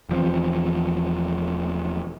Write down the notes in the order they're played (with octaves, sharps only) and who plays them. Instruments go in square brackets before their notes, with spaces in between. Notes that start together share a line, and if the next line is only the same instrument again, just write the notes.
[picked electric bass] E1 E3 F3 C4